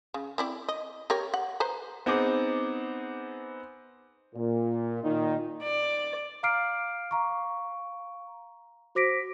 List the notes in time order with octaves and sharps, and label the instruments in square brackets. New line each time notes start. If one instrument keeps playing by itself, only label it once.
[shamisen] C#3
C4 E4 D5
D#5
G4 A#4 C#5
F#5
B4 C5 A#5
[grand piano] B3 C4 D#4 G#4 C5 D6
[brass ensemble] A#2
A#2 D#3 D#4
[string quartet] D5
[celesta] F5 A#5 D6 F6 C7 D7
F5 A#5 C#6
F#4 C5 D6 A#6 B6 D7